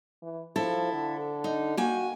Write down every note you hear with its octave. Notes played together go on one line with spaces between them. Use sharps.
E3
F3 E4 A4
D3
D#4
A#3 F#4 G5 G#5